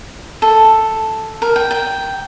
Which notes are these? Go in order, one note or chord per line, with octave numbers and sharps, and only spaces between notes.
A4
A#4
G5
G5